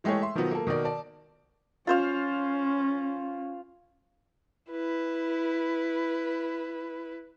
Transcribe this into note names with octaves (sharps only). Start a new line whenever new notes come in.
E3 G#3 A3 G4 G#4 C#5
E5 C6
B2 D#3 F3 F#3 B3
A#3 A4
B2 D#3 A#4 D5
D5 A5
C#4 F4 C5 F5
E4 B4